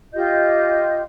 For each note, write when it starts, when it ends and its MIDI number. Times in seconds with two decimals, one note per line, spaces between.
0.14 1.02 65
0.14 1.02 67
0.14 1.02 75
0.14 1.02 91